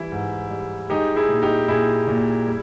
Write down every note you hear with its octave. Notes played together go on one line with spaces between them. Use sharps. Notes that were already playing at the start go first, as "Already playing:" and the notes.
Already playing: E3 G3 E4
G#2
G3
G#3 D#4 G4
E4 G#4
A#2
D#4 G4
A#2 E4 G#4
A#2
G3